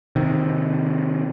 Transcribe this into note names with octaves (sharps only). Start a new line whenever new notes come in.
C3 D#3